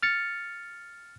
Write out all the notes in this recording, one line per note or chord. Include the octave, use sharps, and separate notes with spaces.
F6 A6 C#7